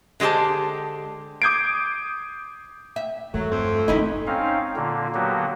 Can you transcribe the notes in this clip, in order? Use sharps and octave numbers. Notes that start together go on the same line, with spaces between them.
D3 G#3 G4 C5 A5
D6 D#6 G6 G#6 C7 D7
E5
E2 G2 F#3 A3
F2 C4
C#3 A3 C#4 D#4 E4 D#5
C4 C#4 D#4 F5
A#2 D3 A#3
D3 F#3 A#3 B3 F#4 G4